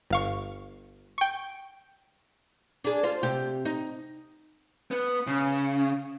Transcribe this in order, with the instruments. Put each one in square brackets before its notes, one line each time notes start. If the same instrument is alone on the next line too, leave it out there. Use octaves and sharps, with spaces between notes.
[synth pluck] G1 F5 C#6
G5 C#6
[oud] D4 G#4
F4 C5
C3 G4
D#4
[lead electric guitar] B3
C#3